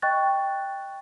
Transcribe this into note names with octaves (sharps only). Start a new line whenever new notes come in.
D#5 G5 C#6 F#6 A6